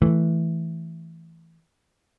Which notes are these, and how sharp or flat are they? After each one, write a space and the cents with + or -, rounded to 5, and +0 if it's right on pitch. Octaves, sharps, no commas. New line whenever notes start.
E3 +0 A3 +0